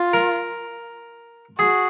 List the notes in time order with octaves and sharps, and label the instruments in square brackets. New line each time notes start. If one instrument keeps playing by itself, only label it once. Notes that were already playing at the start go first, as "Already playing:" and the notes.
Already playing: [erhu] F4
[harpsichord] A#4
[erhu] F#4 [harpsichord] G#4